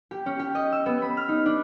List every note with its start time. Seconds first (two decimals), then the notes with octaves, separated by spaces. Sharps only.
0.11 G4
0.26 C#4
0.39 G4
0.55 D#5
0.72 E6
0.86 B3
1.02 B5
1.17 F6
1.29 D#4
1.46 D4